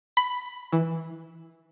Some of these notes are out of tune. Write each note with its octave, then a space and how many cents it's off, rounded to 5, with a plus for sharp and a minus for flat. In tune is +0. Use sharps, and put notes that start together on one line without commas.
B5 +10
E3 -10